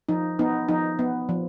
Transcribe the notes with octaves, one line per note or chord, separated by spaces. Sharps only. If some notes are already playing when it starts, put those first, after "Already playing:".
F3 D#4
B3 D#4
F3 D#4
B3
F3